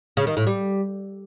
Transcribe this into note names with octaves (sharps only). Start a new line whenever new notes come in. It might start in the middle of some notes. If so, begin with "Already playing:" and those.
C#3
D#3
A2
G3